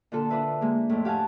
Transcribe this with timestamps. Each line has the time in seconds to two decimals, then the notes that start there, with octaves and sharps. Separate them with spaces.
0.12 A#2 D3 F4 A4
0.30 D4 F4 B4 E5
0.61 G#3 A#3
0.89 F2 A2
1.05 G4 F5 F#5 G#5 A5